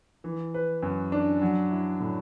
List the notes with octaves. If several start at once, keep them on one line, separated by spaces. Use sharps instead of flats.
E3
B4
F#2
D4
F#3
E4
A2